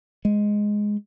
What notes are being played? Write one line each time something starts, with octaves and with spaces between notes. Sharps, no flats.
G#3